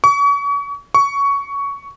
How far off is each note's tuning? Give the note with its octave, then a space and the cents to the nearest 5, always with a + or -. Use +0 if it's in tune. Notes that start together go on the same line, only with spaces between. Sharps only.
C#6 +40
C#6 +15